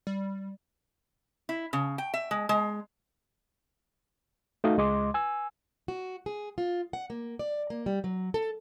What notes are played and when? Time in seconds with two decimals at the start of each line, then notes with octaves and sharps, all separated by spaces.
0.07 G3
1.49 E4
1.73 C#3
1.98 G5
2.14 E5
2.31 G#3
2.49 G#3
4.64 A3 D#4 F#4 D#5 F5
4.77 C#2 G#3 D#5 C6 D6
5.14 G#5 E6
5.88 F#4
6.26 G#4
6.58 F4
6.93 F#5
7.10 A#3
7.39 D5
7.70 A#3
7.86 G3
8.04 F#3
8.34 A4